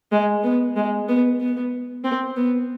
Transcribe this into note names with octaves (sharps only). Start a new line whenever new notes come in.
G#3
B3
G#3
B3
B3
C4
B3